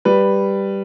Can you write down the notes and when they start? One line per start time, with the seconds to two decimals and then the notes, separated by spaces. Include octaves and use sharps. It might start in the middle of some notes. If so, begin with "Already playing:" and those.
0.05 G3 B4